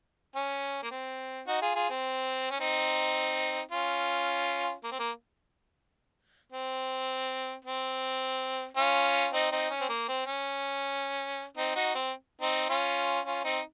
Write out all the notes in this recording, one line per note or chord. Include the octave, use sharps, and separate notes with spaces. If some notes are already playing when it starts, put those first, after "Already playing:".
C#4
A#3
C4
D#4 F#4
F4 G#4
F4 G#4
C4
C#4
C4 D#4
C#4 F4
A#3
C4
A#3
C4
C4
C#4 F4
C4 D#4
C4 D#4
C#4
C4
A#3
C4
C#4
C4 D#4
D#4 F#4
C4
C4 D#4
C#4 F4
C#4 F4
C4 D#4